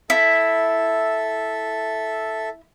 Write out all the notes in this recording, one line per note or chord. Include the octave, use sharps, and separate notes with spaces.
E4 A4 E5